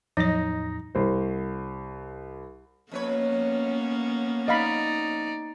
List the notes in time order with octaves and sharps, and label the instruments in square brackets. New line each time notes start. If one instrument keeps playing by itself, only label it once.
[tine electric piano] E2 A2 A#6 [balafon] F3 F#3 D#5 [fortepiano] D#4
[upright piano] C2 C5
[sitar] F2 B4 C#5 [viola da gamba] A#3 B3 C#4
[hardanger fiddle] D#4 D5 [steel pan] D#5 F5 B5